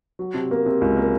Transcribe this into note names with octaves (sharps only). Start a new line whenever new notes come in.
F#3
C3
A#3
C3
C#2
A#3